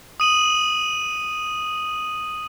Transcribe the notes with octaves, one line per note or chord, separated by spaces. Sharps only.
D#6 D#7 F#7